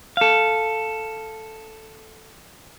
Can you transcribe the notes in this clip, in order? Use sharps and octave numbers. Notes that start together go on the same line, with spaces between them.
A4 F5